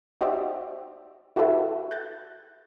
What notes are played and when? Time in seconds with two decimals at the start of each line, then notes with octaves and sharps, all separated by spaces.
0.21 D#4 F#4 G4 C5 D5 E5
1.36 E4 F#4 G4 A4 B4 E5
1.91 F#6 G6 A6